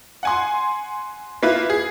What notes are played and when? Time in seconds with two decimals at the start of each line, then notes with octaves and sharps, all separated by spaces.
0.23 F#5 G#5 C6
1.43 A#3 E4 F4 B4
1.70 G#4